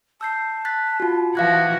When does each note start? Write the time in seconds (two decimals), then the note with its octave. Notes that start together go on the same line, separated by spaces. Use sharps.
0.21 A5 E6 G6 C7
0.65 F#6 A6 B6
1.00 F4 F#4
1.35 E3 F3 F#4 F5 F#6 G#6